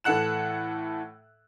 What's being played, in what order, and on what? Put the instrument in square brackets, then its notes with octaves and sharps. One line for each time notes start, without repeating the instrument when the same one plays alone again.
[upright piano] A2 E3 A4 F#5 F#6 E7